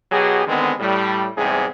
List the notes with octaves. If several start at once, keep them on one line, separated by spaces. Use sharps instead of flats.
B2 F#3 G4 G#4
D3 D#3 G#3 B3 C4
A2 G3
E2 G#2 C3 G3 G#4